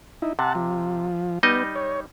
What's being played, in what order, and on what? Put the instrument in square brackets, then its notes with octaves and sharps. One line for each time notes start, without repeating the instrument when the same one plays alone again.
[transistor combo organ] D#4 E4
[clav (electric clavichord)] C3 [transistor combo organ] F#5 A5
[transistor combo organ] F3
[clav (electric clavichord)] G3 D#4 D#5 [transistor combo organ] B3
[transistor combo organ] C#5